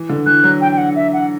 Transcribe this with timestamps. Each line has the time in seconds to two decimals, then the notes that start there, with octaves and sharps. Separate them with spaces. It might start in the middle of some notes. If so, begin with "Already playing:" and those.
Already playing: E3
0.10 D3
0.26 E3 F#6
0.44 F#3
0.61 G5
0.72 G5
0.78 F#5
0.96 E5
1.13 F#5